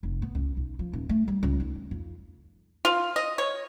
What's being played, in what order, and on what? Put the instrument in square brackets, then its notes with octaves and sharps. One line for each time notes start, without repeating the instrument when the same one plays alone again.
[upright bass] F1
B3
C#2
B1
F3
D#1
A3
G3
C#2
D#3
D2
F2
[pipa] F4
D#5
C#5